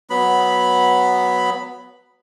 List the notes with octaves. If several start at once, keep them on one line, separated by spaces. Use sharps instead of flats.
F#3 B3 B5